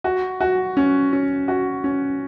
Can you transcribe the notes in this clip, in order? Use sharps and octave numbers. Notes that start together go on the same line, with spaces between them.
F#4
F#4
C#4
C#4
F#4
C#4